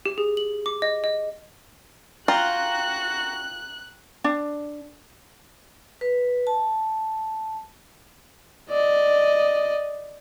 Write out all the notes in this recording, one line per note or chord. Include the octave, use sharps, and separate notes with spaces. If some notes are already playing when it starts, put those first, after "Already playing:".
G4
G#4
F#7
D6
D#5
D#5
F4 F#4 G5 A#5 F#6
D4
B4
A5
D5 D#5